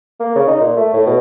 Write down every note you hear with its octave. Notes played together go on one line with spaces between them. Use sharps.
A#3
C#3
D#4
A#2
A3
A2
B2